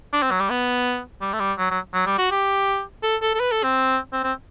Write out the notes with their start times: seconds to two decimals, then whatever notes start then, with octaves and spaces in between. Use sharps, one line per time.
0.13 D4
0.22 C4
0.31 F#3
0.40 G3
0.50 B3
1.21 G3
1.33 A3
1.40 G3
1.58 F#3
1.71 F#3
1.94 F#3
2.06 G3
2.18 F#4
2.31 G4
3.03 A4
3.22 A4
3.35 A4
3.40 B4
3.52 A4
3.63 C4
4.13 C4
4.24 C4